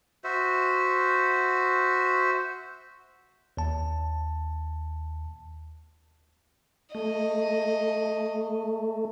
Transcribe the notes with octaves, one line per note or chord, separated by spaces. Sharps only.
F#4 C5 E5
D#2 A5
A3 D#5